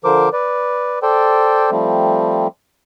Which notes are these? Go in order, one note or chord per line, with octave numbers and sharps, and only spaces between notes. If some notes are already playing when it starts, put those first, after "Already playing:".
D3 F3 A#4 C5 D6
B4 D5
A4 C5 D5 G5
F3 G3 A3 C4